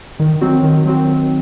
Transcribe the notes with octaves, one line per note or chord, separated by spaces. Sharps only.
D#3
F#3 C4 F#4
D#3
F#3 C4 F#4
D#3